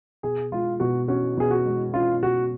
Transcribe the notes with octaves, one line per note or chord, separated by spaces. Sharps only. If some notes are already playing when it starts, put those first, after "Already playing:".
B2 G#4
G#3 F4
B2 F#4
C#4 F#4
B2 G#4
F#4
G#3
C#4 F4
B2 F#4